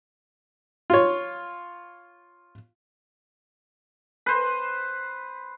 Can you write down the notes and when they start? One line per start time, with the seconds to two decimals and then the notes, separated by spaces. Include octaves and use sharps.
0.90 F4 C#5
4.26 B4 C5